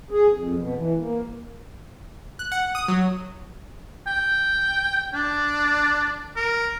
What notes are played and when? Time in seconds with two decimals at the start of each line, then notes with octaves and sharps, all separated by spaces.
0.11 G#4
0.33 F2
0.57 B2
0.75 E3
1.00 A#3
2.39 F#6
2.52 F#5
2.75 D#6
2.88 F#3
4.07 G5
5.14 D4
6.36 A#4